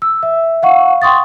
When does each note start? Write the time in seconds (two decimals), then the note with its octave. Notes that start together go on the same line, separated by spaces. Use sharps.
0.02 E6
0.23 E5
0.63 F5 F#5 C#6
1.02 G5 C6 C#6 D#6 A6